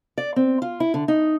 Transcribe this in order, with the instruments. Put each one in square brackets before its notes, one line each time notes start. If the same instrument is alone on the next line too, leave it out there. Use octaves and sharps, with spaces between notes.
[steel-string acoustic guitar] D5
C4
F4
E4
D3
D#4